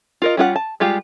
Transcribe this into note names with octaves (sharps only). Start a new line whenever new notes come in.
F4 A#4 D#5
G3 C#4 F4 A#4 F#5
A5
G3 G#3 F4 G4